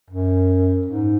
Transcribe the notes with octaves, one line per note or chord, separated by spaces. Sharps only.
F#2
G#2